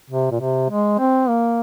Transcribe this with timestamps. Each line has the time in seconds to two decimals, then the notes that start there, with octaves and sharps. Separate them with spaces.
0.10 C3
0.31 A#2
0.41 C3
0.70 G#3
0.99 C4
1.28 A#3